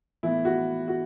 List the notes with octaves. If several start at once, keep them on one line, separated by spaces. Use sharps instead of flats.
A2 E3 B3 E4
F#4
F#4